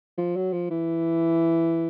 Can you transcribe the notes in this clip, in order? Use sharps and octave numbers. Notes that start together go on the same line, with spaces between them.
F3
F#3
F3
E3